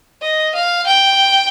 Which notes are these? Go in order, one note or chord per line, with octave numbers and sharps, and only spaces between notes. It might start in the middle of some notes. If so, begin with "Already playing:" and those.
D#5
F5
G5